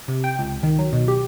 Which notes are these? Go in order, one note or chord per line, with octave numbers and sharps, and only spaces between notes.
C3
G5
C#2
D#3
F#3
B2
G4